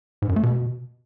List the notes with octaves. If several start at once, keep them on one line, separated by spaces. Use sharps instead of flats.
G#2
F#2
A3
B2